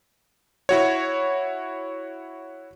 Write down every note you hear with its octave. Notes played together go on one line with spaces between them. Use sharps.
E4 F#4 C#5